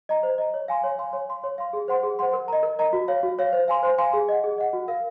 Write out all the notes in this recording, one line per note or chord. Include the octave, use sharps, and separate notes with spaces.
D#5 A#5
C5
D#5 A#5
C#5
F5 G#5 C6
C#5
F5 G#5 C6
C#5
F5 C6
C#5
F5 C6
G#4
C5 F#5 C6
G#4
C5 F#5 C6
A#4
D#5 A#5
A#4
D#5 A#5
F#4
C#5 F5
F#4
C#5 F5
C5
F5 G#5 C6
C5
F5 G#5 C6
G#4
D#5 F#5
G#4
D#5 F#5
F#4
A#4 F5